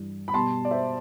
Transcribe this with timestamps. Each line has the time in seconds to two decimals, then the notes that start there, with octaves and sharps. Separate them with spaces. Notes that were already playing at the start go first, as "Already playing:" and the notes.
Already playing: G2 E3 G3
0.28 B5
0.34 B2 G3 A5 C6
0.65 D5
0.71 C5 E5